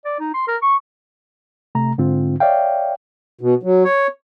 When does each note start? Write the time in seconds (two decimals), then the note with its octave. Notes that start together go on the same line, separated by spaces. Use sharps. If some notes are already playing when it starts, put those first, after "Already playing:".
0.05 D5
0.20 D#4
0.34 C6
0.48 A#4
0.62 C#6
1.75 C3 A3 A#5
1.98 G#2 D3 C4 F4
2.40 C#5 D5 E5 F5 G5
3.41 B2
3.63 F#3
3.84 C#5